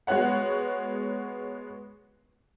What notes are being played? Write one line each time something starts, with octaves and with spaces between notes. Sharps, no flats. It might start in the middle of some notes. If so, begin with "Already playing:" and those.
G#3 B3 F#4 C#5 F#5